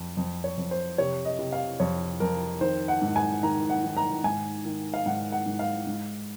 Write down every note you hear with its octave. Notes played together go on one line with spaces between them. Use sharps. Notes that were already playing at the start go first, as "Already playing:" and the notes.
Already playing: F2
F2
C#5
F2
C5
C3 C#5
D#5
C3
F5
F2 C#5
F2 A#4
D#3 C5
F#5
G#2
G#5
D#3 A#5
F#5
D#3
A#5
G#2 G#5
D#3
F5
G#2 F#5
F#5
G#2
F5
G#2